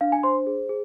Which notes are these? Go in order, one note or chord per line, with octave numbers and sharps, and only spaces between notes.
D4 F5
G#5
C5 C6
G#4
G#4